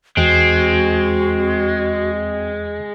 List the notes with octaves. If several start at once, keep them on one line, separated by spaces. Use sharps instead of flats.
E2 G#3 C4 F#4